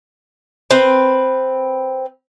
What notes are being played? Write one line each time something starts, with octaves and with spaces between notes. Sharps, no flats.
C4 B4